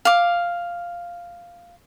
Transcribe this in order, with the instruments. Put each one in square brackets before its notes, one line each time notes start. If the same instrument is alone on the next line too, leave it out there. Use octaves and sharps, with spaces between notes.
[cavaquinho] F5 D6